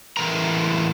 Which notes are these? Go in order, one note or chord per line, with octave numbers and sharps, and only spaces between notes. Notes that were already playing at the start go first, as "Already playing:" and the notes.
A2 E3 G#3 A3 A#4 A#5